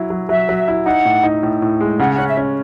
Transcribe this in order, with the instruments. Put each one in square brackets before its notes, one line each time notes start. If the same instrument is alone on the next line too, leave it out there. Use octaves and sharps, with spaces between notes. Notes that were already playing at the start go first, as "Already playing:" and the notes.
Already playing: [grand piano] F#3 E4
F#3
[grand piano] F#3 [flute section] E5
[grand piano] F#3
E4
[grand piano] D#4 [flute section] F#5
[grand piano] A2
D#4
A2
A2
G#3
[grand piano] C#3 [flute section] F#5
[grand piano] C#4 [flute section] F#5
[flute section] E5
[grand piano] C#4